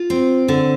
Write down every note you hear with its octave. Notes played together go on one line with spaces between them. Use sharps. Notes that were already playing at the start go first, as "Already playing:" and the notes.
Already playing: F4
C4
D3